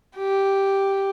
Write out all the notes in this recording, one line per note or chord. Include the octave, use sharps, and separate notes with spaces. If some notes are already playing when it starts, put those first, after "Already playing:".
G4